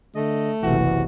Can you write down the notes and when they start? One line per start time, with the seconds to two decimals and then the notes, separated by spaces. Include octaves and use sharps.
0.15 D3 A3 D#5
0.63 F#1 B1 C3 E3 F#4